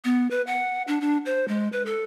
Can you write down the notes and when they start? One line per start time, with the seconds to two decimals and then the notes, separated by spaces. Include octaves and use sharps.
0.05 B3
0.31 B4
0.47 F#5
0.88 D4
1.01 D4
1.26 C5
1.48 G#3
1.72 B4
1.86 A4